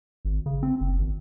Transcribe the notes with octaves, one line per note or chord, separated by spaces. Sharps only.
G#1
C#3
C4
F#1
G#1